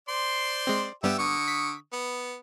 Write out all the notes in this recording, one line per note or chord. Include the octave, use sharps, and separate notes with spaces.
C5 D5 C6
G#3 C4
G2 G3 B3 G4 E5
D3 C#6 D#6
B6
B3